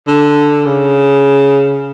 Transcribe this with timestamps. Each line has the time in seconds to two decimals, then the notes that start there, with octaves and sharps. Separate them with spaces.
0.08 D3
0.66 C#3